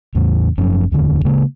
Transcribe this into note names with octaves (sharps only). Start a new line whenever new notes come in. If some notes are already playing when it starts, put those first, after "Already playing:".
E2 A2 C#3
F#1 F#2 F3 C#4
D1 E2 D3
C#3 G#3 A#3